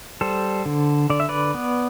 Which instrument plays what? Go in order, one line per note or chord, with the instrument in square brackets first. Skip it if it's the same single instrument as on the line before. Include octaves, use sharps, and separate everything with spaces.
[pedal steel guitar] G3 A4 C5
D3
D3 D5
E5
B4 D5
B3